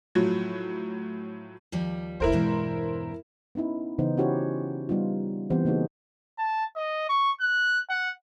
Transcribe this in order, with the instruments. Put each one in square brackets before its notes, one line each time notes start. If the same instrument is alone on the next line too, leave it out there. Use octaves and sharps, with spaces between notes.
[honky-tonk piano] A2 F3 F#3
[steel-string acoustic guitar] D#2 F3 G3
[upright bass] F1 D2 [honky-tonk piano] E4 A#4 C5
[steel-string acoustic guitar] E2 G2 E3 [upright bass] B2 G#3
[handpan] B3 C#4 D#4 E4
C#3 E3 B3 D#4 C5
C#4 E4 F#4 G4 C5 C#5
G3 B3 D#4 F4
E3 B3 C4 G4 C5
C#3 A#3 D#4 F#4 G#4
[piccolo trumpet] A5
D#5
C#6
F#6
F#5